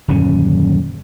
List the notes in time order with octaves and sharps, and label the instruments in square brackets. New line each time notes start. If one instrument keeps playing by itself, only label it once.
[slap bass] D#1 F#2 D3 C#4